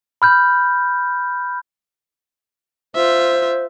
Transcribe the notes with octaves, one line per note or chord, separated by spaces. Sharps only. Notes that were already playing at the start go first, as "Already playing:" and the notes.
B5 F6 G6
F4 C5 E5